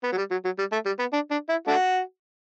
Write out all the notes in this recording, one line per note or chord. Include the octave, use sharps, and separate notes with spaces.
B3
F#3
G3
F#3
F#3
G3
A3
G3
B3
D4
D4
E4
A3 D4 F#4